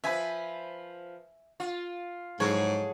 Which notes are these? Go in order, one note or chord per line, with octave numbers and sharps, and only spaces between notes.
F3 B4 E5 G#5
F4
G#2 F#3 E4 G#4 A4 C#5